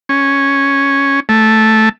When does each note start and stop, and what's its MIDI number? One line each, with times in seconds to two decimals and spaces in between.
0.09 1.20 61
1.29 1.89 57